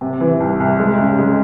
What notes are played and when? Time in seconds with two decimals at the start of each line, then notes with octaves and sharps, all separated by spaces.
0.01 C3
0.21 E3
0.40 C2
0.60 C2
0.79 G#3
0.99 C#3
1.18 G#3